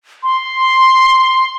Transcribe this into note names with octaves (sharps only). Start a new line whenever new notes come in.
C6